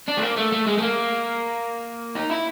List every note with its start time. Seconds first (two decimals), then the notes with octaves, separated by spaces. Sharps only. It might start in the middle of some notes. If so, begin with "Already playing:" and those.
0.08 D4
0.18 A3
0.22 A#3
0.37 A3
0.52 A3
0.67 G#3
0.78 A3
0.82 A#3
2.15 D#4
2.30 E4